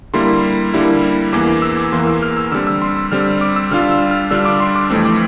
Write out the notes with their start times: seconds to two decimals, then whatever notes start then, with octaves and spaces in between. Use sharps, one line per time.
0.14 D3 G3 A#3 E4 C6
0.74 D3 G3 A#3 E4
1.33 E2 E3 A#3 D6
1.47 D6
1.62 E6
1.77 D6
1.92 E2 E3 A#3 C6
2.07 E6
2.22 F6
2.37 E6
2.52 D3 G3 C4 E6
2.67 E6
2.82 C6
2.97 E6
3.11 D3 G3 C4 F6
3.26 E6
3.41 D6
3.56 E6
3.71 D3 G3 D4 F4 F6
3.91 E6
4.11 F6
4.31 D3 G3 D4 F4 E6
4.45 D6
4.60 C6
4.76 D6
4.90 F2 E3 A3 C4
5.05 D6